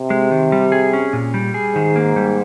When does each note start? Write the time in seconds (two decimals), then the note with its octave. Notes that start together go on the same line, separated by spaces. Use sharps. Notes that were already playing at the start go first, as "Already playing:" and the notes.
Already playing: C3
0.10 G#3
0.31 D#3
0.52 G3
0.72 G#4
0.93 C#4
1.13 A#2
1.34 G3
1.54 G#4
1.75 G#2 D#3
1.96 A#3
2.16 G3